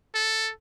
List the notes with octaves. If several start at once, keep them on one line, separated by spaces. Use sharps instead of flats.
A4